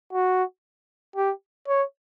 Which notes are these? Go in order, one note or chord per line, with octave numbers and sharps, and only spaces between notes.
F#4
G4
C#5